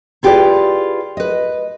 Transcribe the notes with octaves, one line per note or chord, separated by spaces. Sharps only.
E4 F4 G4 G#4 B4 D5
B4 D#5